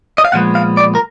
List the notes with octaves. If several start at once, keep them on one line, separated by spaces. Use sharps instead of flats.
D#5
F5
A#2 F3 G#3 B3 F#5
F5
D5
A#4